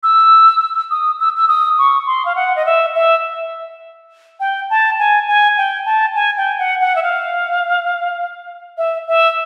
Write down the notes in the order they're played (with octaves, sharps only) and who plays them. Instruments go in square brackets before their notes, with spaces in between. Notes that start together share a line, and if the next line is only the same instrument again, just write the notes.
[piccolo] E6
D#6
E6
E6
D#6
C#6
C6
F5
F#5
D#5
E5
E5
G5
A5
G#5
G#5
G5
A5
G#5
G5
F#5
F#5
E5
F5
E5
E5